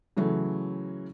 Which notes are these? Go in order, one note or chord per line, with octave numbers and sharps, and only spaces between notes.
C#3 E3 F#3 A3